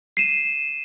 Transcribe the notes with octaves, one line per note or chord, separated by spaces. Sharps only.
C7 D#7 E7